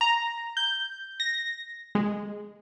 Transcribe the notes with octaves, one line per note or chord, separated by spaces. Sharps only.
A#5
G6
A#6
G#3